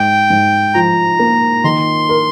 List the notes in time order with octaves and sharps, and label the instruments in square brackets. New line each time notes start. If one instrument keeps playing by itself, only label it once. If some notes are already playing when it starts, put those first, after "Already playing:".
Already playing: [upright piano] G#2 [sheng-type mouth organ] G5
[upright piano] G#2
[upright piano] F3 [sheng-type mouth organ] A#5
[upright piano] A#3
[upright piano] D#3 [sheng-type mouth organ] C6
[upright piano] A#4